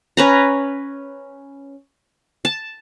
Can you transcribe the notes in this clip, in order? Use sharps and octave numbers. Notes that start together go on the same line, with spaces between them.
C#4 B4 A#5
A5